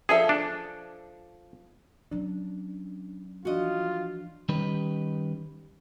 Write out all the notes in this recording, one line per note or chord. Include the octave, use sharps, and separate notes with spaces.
F3 G#4 A4 E5
D4
F#3 C#4 D4
E3 F3 D4 F4 F#4 D#5
D#3 G3 C#4 D#4 G4 B4